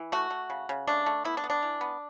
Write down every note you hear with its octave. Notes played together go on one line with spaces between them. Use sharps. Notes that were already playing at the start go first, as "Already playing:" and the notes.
Already playing: E3
A3 F#4
A3
C#3
C#3
A3 D4
A3
B3 E4
D4
B3
D4
E3
B3